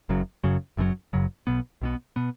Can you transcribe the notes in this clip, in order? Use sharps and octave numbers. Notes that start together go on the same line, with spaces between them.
F#1 F#2 C#3 F#3
F#1 F#2 C#3 F#3
F#1 F#2 C#3 F#3
F#1 F#2 C#3 F#3
B1 B2 B3
B1 B2 B3
B2 B3